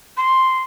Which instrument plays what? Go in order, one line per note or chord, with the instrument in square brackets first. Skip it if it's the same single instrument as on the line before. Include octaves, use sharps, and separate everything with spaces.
[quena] C6